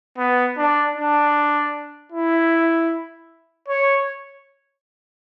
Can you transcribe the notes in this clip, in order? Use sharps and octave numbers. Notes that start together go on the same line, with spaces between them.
B3
D4
D4
E4
C#5